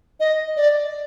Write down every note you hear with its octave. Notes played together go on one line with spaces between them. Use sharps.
D#5
D5